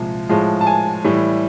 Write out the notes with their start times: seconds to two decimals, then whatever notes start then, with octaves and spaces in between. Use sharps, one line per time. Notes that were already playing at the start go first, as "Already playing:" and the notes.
Already playing: C2 A#2 F3 G#3
0.29 A2 F3 G#3
0.61 A5
0.67 G#5
1.04 A2 E3 G3